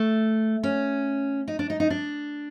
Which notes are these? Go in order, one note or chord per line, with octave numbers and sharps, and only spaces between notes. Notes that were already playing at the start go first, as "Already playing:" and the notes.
Already playing: A3
C#4
D#4
D4
D#4
D#4
D4